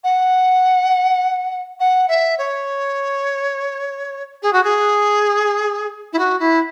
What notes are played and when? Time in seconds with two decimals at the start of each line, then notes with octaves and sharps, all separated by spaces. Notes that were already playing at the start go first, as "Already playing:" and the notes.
0.03 F#5
1.79 F#5
2.08 E5
2.38 C#5
4.42 G#4
4.52 F#4
4.63 G#4
6.12 E4
6.18 F#4
6.39 E4